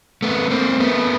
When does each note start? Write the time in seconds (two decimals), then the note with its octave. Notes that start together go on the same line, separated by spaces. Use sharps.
0.22 A3 B3
0.50 A#3 C4
0.80 A3 B3